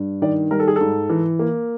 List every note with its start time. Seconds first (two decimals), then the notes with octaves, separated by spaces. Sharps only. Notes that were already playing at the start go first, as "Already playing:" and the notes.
Already playing: G2
0.22 D#3 D5
0.51 G3 A#4
0.60 A4
0.68 G#4
0.76 G#2 A4
1.10 E3
1.39 A#3